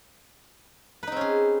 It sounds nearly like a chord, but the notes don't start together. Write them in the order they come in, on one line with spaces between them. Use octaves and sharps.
B4 D#4 C4 C#4 G#4